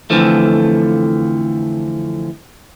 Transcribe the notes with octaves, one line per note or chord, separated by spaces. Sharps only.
F2 D3 E3 F3 A3